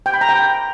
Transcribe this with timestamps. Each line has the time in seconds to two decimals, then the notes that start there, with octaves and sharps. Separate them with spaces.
0.06 G5
0.14 B5
0.21 A#5
0.29 G5